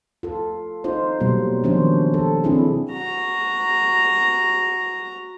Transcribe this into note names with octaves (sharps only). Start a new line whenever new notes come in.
F4 A4
D#4 F4 C5
B2 F#3 G3 A#3 B3
D#3 F3 F#3 C#4 D4 C5
A4
C4 D4 E4 G#4
F#4 A#5